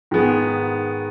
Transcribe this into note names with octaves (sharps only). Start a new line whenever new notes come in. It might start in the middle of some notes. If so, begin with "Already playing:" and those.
G#2 D#3 G#3 B3